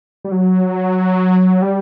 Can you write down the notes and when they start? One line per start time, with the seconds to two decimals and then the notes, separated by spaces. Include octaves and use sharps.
0.25 G3
0.32 F#3
1.62 G3